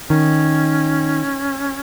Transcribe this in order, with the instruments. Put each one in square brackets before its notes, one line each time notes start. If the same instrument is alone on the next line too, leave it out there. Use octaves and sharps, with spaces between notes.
[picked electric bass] D#3 [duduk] C#4